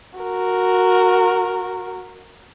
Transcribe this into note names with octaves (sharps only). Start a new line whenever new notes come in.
F#4 A#4